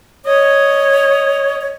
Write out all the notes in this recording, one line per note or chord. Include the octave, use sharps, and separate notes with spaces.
C#5 D#5
C#5